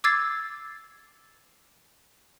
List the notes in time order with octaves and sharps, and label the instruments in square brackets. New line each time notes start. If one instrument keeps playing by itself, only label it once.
[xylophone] D6 E6 G#6 A6 C7